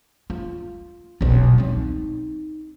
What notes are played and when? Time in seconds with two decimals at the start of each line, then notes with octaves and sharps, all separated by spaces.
0.30 F4
1.21 D#1 B1
1.58 C4 D#4